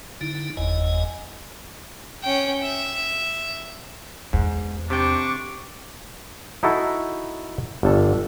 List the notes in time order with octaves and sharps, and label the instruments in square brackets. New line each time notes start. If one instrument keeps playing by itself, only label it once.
[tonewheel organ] D3 D#4 E4
F#1 E2 D#5 G#5
[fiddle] C#4 G5
E5
[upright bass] E2 [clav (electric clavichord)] G#2
[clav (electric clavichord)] C3 G5 [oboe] D4 [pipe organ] C#6 D6
[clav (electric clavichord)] D#4 E4 F#4 A4
G1 G2 A4